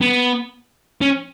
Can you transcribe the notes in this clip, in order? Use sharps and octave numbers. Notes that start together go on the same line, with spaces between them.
B3
C#4